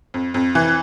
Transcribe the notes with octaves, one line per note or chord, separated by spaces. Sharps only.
F2
F2
E3